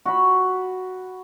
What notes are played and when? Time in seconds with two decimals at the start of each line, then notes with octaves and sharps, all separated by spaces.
0.05 F#4 B5